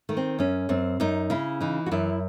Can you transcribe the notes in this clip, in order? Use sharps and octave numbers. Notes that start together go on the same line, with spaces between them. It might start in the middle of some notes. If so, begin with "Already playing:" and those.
D#3 A3
C4
F#2 C#4
F#2 C4
F#2 D#4
C#3 E4
E3 D#4
F#4
F#2 E4